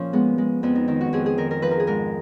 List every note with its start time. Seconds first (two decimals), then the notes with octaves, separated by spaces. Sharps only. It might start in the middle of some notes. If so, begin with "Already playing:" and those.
Already playing: A#2 F3 C#4
0.13 G#3 B3
0.38 G#3
0.63 F2 B3
0.75 D#4
0.88 D#3 D#4
1.01 F#4
1.13 F2 G#4
1.26 G#4
1.38 D#3 A#4
1.51 A#4
1.62 F3 B4
1.71 A#4
1.80 G#4
1.87 G#2 A#4